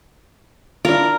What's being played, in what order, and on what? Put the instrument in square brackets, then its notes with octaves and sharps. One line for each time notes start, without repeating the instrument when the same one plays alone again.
[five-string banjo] D4 E4 F4 [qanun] A#4